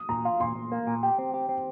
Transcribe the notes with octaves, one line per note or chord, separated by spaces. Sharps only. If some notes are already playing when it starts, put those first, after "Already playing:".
Already playing: D#6
A#2 A#5
F4
A#2 C6
A#2
A#3
A#2
G4
C4
G4
C4